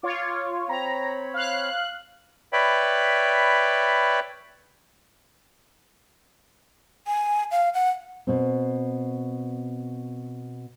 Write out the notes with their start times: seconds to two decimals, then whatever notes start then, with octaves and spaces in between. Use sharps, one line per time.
0.03 F4 C#5 D6
0.69 C4 C#5 A#5 B5
1.34 F5 F#6
2.53 B4 C#5 D5 E5 G5 B5
7.07 G#5
7.51 F5
7.74 F#5
8.27 B2 C4